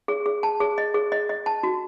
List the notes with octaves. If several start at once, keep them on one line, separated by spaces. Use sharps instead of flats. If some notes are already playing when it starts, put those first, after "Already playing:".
G#4
G#4
A5
G#4
D#5
G#4
D#5
D#5
A5
F#4